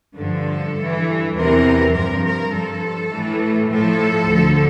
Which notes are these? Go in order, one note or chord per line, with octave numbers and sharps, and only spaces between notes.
G2 D3 F3 A4
G2 E3
E2 C3 E3 A#4
G2 F3 A#4
A#4
G2 F3 A4
A2 E3
A2 F3 A4
D2 D3 F3